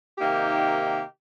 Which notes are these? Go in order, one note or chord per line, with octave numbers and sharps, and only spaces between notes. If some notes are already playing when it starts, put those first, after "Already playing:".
C3 D#3 A#3 D#4 G4